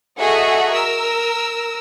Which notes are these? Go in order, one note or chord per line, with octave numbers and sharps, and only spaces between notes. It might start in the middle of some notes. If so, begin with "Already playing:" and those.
F#4 G#4 A4 D#5 E5 F#5
A#4 E6